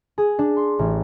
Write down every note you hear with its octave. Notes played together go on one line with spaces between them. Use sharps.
G#4
D4
C6
A1